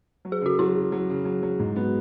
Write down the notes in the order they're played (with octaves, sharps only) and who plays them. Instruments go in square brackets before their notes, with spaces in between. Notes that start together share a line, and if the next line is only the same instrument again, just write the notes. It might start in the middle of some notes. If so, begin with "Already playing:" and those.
[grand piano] F#3
[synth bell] G#4
[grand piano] C#3 [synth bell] F#4
[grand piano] F#3 [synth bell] E4
[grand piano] C#3
F#3
C#3
F#3
F#3
G#2
B3